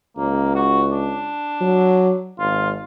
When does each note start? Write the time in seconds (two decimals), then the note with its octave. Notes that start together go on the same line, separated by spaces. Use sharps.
0.17 C#2 A#3
0.55 F#4
0.91 D4
1.61 F#3
2.39 G#1 F4